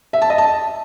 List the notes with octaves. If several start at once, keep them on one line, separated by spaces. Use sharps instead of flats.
E5
A5
D#5
A5